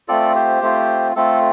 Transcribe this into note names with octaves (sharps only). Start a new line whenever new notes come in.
A3 C4 F4 A4 D5
G4 C5
A3 C4 F4
A3 C4 F4 A4